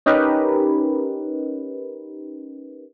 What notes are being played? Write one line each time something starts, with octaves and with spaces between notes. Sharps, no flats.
C#4 D#4 G4 A#4 B4